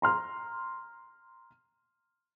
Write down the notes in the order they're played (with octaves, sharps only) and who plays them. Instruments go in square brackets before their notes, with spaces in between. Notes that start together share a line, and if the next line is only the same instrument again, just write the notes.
[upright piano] A#5 C6 F6